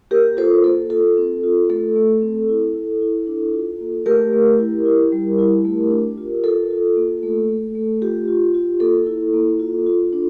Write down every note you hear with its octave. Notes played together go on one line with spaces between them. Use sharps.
A#3 G4 A#4
F4 A4 C5
A#3 A4
F4 A4
C4
F4
A3 A4
A3
C4
E4
E4
E4
D4
F4
A#3
A3 G4 A#4
A3
E4
E4
G3
E4
A3
D4
F4
F4 A4
F4
A#3
A3
A3
A3
F4 G4
F4
F4
A#3 A4
E4
A#3
F4
F4
D4